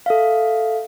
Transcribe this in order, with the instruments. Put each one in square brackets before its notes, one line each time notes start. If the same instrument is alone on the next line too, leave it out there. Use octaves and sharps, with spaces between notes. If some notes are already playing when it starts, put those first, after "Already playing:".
[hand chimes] A4 E5 F5